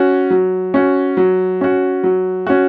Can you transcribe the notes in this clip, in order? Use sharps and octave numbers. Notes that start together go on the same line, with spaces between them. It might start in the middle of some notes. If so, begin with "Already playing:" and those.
Already playing: C#4 F#4
F#3
C#4 F#4
F#3
C#4 F#4
F#3
C#4 F#4